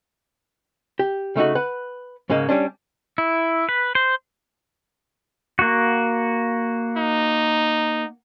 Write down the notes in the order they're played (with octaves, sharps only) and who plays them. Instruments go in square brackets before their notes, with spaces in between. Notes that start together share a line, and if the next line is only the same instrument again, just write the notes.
[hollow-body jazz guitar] G4
C#3 A3 D#4 F#4
B4 F#5
G#2 C#3 G#3 A#3
G3 G#3 C#4 D4
[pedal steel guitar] E4
B4
C5
A#3 F#4
[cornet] D#4